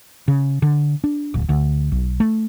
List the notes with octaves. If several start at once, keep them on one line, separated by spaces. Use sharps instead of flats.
C#3
D3
D4
D1
D2
B1
A3